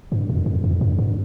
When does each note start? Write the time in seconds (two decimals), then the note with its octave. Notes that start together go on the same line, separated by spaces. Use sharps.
0.12 G2
0.29 F2
0.46 F2
0.64 F2
0.81 G2
0.98 G2